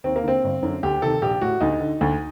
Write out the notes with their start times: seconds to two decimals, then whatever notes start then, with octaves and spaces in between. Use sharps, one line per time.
0.04 D#2 C4
0.16 A#3
0.24 D3 C4
0.44 G1
0.63 F#2 D3
0.83 D2 G4
1.02 C3 D#3 A4
1.22 A#1 G4
1.41 A2 F#4
1.60 D2 D#4
1.80 D3
2.01 D2